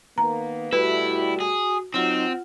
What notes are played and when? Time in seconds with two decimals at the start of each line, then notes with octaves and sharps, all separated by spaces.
0.18 D#3 A#3 B3 A#5
0.73 B2 G3 A3 E4 F#4 B4
1.40 G#4
1.94 F#3 C4 D#4 F4 F#5